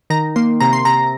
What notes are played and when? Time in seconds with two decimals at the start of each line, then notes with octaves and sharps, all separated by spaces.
0.10 D#3 A#5
0.36 A#3 C6
0.60 C3 A#5
0.73 C6
0.85 C3 A#5